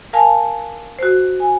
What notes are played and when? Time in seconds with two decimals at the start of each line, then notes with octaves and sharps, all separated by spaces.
0.13 A#4 F5 G#5 A5
0.99 F#4 C5
1.40 G#5